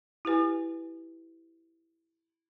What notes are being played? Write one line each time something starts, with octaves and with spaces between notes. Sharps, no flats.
E4 G4 B4 G#5